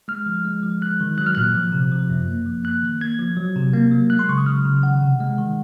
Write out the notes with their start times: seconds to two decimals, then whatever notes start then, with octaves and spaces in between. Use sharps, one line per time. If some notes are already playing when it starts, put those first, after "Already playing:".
0.08 G#3 F6
0.26 F3
0.45 G#3
0.63 F3
0.82 G#3 F#6
1.00 D#3
1.18 F#3 F#6
1.27 F6
1.35 A#2 F#6
1.54 F3
1.72 C3
1.92 F3
2.10 F#2
2.28 A#3
2.46 F3
2.64 A#3 F#6
2.83 D#3
3.01 A#3 G#6
3.19 F3
3.37 F#3
3.56 C3
3.73 A#3
3.92 F#3
4.10 G#3 F#6
4.19 C6
4.29 C#3 C#6
4.38 D#6
4.46 F#3 F6
4.65 C#3
4.83 D#3 F#5
5.02 C3
5.20 G#3
5.38 D#3